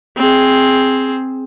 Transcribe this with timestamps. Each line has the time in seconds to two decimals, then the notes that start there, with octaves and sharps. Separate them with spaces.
0.17 C4 G#4